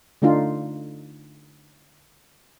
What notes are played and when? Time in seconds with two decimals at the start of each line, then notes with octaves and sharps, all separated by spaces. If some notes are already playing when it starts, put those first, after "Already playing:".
0.22 D3 A3 D4 D#4 F4